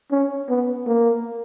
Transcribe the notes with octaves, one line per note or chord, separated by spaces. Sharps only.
C#4
B3
A#3